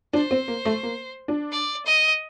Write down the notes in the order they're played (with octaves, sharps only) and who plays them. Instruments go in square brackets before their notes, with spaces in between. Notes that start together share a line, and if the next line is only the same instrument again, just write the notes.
[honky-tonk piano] D4 [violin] C5
[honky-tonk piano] C4
A#3
A3
A#3
D4
[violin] D5
D#5